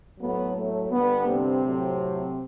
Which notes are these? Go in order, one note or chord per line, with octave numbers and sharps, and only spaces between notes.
A2 F#3 A3 B3
A3
G2 D3 G3 B3
C3 C4
A2 F#3 A3